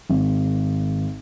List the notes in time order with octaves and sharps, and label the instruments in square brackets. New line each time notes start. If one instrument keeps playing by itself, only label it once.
[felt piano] G#1